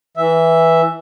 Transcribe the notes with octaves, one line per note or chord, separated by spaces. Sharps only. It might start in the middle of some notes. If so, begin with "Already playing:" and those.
E3 E5